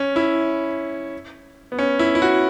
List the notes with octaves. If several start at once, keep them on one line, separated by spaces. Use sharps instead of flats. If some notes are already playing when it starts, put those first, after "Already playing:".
Already playing: C#4
E4
B3
C#4
E4
E4
F#4